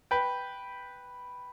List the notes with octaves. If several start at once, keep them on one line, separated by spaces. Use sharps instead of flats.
B4 G5